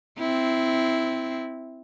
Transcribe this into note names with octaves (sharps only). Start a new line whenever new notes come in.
C4 E4